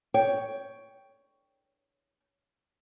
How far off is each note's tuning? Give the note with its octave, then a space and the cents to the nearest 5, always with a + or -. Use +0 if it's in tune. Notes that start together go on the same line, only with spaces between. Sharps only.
C#5 +10 G5 +0